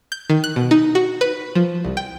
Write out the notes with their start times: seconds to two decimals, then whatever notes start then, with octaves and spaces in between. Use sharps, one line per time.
0.12 G6
0.30 D#3
0.44 F#6
0.56 B2
0.71 D#4
0.95 F#4
1.21 B4
1.55 F3
1.84 C2
1.97 G5